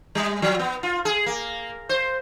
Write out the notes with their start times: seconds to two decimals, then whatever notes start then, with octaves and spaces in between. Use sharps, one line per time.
0.15 G3
0.42 F3
0.59 B3
0.83 F4
1.05 G#4
1.26 A#3
1.89 C5